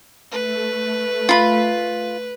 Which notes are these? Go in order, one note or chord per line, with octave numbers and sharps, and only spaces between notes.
A3 B4
F4 B5